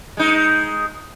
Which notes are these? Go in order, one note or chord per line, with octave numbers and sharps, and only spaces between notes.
G#3 D#4